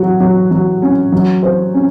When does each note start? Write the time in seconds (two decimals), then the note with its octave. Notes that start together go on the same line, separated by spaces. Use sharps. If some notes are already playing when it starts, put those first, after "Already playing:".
Already playing: F#3 F#4
0.20 F#3
0.51 F#3
0.82 C#4
1.12 F#3
1.43 C5
1.74 C#4